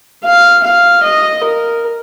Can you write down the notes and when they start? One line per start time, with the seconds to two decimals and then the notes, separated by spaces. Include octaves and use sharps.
0.24 F5
0.64 F5
1.03 D#5
1.44 A#4